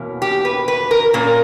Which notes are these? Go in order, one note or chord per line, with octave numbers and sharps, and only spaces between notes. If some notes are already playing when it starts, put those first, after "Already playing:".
Already playing: E2 B2 A#3 C#4
G4
B4
B4
A#4
A#2 A#3 C#4 A#4